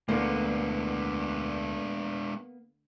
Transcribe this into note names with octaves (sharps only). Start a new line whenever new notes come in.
D2 G#3 A#3 B3 D4